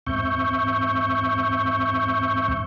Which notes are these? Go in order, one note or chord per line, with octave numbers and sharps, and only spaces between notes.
E2 G#2 C4 E5 C#6 G6